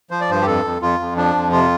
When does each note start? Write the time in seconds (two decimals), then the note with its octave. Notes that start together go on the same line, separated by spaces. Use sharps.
0.10 F3 C5
0.21 D5
0.29 G2 C5
0.41 G4
0.46 F2 A4
0.64 F2
0.81 F2 F4
1.00 F2
1.16 F3 D4
1.35 F2
1.52 C3 F4